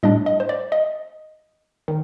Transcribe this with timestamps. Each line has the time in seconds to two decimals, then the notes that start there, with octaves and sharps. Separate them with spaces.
0.03 A2 G3 D4 D#5
0.26 D#5
0.40 C5
0.49 D5
0.72 D#5
1.88 D#3